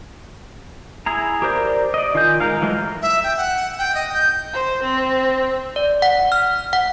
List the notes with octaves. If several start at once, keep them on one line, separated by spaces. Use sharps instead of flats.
E4 G#4 A#5
G4 A#4 C5 D5
D5 D#5
D#3 F4 D#5 G#5 G6
G#3 D#4 A#4 F5
E3 F#3 G#3 A3 F4
E5
G5
F#5
G5
D#5
G6
C5
C4
D5
F#5
F6
F#5